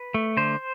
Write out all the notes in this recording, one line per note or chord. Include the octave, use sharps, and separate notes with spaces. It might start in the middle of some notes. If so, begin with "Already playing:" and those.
Already playing: B4
A3
D3 C5